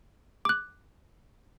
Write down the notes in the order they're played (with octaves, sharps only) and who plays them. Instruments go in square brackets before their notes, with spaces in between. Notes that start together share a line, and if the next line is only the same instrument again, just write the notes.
[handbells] D6 F#6